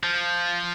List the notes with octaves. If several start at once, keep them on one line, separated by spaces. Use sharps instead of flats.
F3